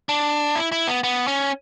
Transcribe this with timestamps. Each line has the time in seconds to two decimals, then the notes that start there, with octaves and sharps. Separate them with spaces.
0.09 D4
0.56 E4
0.72 E4
0.87 B3
1.04 B3
1.27 C#4